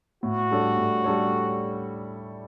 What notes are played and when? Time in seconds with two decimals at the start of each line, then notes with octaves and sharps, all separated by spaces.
0.23 A2 F#4
0.51 G3 D4 A4 C#5
0.77 A2
1.04 G3 D4 A4 C#5